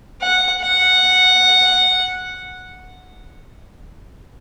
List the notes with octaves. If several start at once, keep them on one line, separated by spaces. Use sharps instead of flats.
F#5
F#5